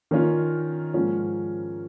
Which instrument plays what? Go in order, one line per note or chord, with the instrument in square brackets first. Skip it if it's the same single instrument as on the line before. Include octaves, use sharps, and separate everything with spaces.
[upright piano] D#3 A#3 C#4 F4
G#2 F3 A#3 C#4